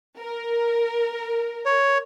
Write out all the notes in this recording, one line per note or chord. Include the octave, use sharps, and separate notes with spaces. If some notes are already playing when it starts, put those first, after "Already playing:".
A#4
C#5